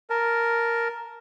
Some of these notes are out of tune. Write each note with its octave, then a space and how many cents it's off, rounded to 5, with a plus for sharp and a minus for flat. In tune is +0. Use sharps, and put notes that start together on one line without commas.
A#4 +0 A5 +0